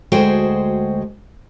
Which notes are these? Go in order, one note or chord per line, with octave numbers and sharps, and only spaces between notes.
D2 G#3 F#4 G#4 C5 G5